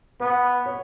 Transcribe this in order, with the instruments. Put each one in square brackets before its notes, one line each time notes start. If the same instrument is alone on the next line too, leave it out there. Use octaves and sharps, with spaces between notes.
[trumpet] B3 [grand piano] B4
[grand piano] C#5